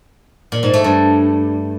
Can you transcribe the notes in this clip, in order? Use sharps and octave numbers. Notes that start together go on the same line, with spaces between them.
A#2
G#2
A3
G2